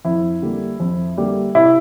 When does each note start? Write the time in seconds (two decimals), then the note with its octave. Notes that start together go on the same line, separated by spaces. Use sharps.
0.05 F2 E4
0.42 D3 G3 A#3
0.80 F2
1.17 D3 G3 A#3
1.55 C3 E4